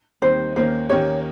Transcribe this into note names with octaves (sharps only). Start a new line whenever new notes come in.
D#2 D#3 G3 C4 D#4 C5
D#2 D#3 A#3 C#4 C5
D#2 D#3 A#3 C#4 G4 C#5